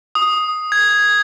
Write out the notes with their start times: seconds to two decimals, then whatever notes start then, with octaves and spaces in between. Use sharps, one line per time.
0.15 D#6
0.72 G#6